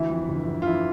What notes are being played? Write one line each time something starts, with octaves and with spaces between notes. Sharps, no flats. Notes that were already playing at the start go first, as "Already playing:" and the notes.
Already playing: D2 E3 E4
F2
G1
G1
F4
E3 E4